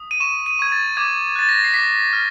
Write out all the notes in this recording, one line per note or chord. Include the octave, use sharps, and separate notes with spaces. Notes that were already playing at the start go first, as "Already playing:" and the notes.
Already playing: D#6
D#7
C#6 E7
D#7
C#6 G#6
A6
D6 G#6
F#6 A6
A#6
C7
D6 B6
F6